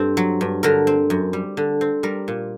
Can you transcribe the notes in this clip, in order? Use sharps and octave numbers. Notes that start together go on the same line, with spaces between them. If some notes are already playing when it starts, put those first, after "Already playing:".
Already playing: G2 C4 A4
F#3
G2
D3 A#4
C4
F#2
G3
D3
C4
G3 A#4
A#2